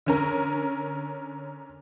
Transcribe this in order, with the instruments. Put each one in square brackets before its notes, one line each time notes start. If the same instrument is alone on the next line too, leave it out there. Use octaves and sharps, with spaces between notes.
[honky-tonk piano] D3 C#4 A#4